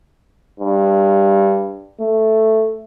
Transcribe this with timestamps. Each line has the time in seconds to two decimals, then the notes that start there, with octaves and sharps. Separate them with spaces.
0.60 G2
2.01 A3